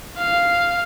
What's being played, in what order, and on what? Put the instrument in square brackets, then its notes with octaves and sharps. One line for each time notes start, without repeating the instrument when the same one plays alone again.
[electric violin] F5